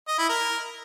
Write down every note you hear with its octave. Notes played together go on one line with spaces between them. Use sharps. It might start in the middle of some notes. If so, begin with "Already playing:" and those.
D#5
E4
A#4